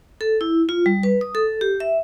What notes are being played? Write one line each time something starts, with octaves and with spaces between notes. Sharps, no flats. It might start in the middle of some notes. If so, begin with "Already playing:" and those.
A4
E4
F4
G3
B4
D#6
A4
G4
E5